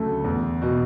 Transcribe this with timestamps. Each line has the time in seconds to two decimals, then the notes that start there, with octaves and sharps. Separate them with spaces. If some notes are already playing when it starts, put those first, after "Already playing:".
Already playing: D2 C#3 F#3 A3
0.24 E2
0.62 B2